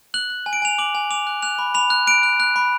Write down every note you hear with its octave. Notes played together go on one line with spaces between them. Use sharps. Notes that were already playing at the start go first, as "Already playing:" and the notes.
F#6 F#7
F#6
G#5
D7
G#5 F7
D6 F#7
G#5
D6 F7
F#6
F#6 F7
B5
B5 F7
F#6
F#6 D7
F#6
F#6
B5